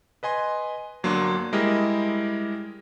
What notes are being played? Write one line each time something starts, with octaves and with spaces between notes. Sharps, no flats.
B4 D#5 G#5 C6
G1 F#3 A#3 D4 C6
G3 G#3 E4 G4 A#4 D#5